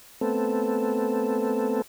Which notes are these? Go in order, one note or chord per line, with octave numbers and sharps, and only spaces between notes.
A3 B3 C4 A4